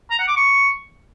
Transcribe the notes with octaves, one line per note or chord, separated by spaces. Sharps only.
A#5
F#5
D6
C#6